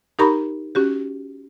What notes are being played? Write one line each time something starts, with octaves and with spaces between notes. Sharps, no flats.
D#4 G4 A#4 A#5 B5 C#6
C#4 F#4 G4